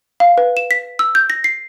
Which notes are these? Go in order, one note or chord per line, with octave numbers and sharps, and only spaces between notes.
F5
B4
E7
B6
E6
G6
A#6
C7